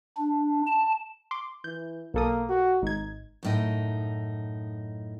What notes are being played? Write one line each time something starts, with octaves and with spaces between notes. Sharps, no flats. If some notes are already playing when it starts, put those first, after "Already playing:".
D4
A5
C6 D6
E3 G6
B1 A#3 A4 D#6
F#4
G#1 D#4 G#6
F#2 A2 D#4